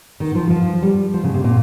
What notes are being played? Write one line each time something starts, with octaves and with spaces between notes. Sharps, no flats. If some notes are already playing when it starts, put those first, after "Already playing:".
D#3
F3
F3
G3
F3
C#3
C3
A#2